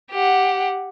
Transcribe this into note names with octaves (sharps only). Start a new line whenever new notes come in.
G4 F#5